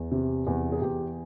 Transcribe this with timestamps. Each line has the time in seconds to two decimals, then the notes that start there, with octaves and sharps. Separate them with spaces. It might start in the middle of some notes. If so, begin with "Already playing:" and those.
Already playing: E2
0.11 C3
0.47 E2
0.72 G#4
0.81 E2 G4